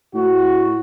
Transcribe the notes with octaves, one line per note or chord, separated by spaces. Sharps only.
A2 F#4